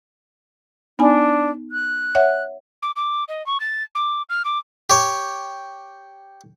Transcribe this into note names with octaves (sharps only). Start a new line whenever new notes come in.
B3 D4 D#4 G#5
F#6
C#5 E5 F#5
D6
D6
D#5
C#6
A6
D6
F6
D6
G4 C#5